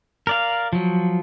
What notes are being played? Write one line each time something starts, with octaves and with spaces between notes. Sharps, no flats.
A#4 D5 F5
F3 F#3